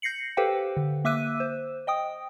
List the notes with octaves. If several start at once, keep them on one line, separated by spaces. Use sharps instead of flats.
G6 A#6 C7 C#7 F#7
G4 A4 B4 C5 F5 G5
D3
A#3 E5 D6 E6 F#6 D#7
C5
D#5 G5 D#6